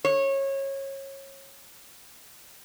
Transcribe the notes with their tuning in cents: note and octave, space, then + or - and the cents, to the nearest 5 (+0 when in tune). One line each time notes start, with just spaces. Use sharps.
C#5 -25